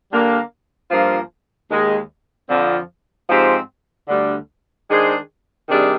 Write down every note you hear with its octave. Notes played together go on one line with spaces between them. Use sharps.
D3 G3 A#3
G2 F3 A#3 F4 C5
D#2 D#3 G#3
F2 D3 F3 C4 F4
G#2 F3 C4 G4 C5
D2 D3 G3 D4
D#3 G#3 D4 G#4 C5
C3 D#3 G3 D4 G#4